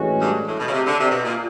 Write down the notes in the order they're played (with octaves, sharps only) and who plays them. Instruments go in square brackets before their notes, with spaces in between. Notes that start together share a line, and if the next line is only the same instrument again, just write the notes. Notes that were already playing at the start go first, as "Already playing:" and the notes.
Already playing: [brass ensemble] A2 E3 G#3 C#4 F#4
[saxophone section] G2
A2
B2
C#3
C3
D3
C3
B2
A#2